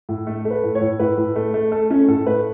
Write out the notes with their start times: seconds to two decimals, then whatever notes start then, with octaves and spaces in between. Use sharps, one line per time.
0.09 A2
0.27 A3 A4
0.45 A3
0.51 B4
0.63 A2
0.75 C#5
0.81 A2
0.99 A2 B4
1.18 A2
1.36 A3
1.54 A3
1.72 A3 A4
1.90 A3 C#4
2.08 A2 A4
2.26 A3 B4